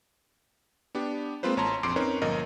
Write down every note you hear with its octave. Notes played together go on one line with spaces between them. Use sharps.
B3 D4 G4
G#3 A#3 C4 F4 B4 C5
A1 C#5 A5 A#5 C6
A#1 F2 C6 D6 C7 D7
C4 C#4 D#4 A#4 B4 C#5
G1 A#2 F3 A#4 D#5